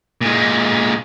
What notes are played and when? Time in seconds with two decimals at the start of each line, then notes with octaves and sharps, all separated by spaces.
0.21 A#2 G#3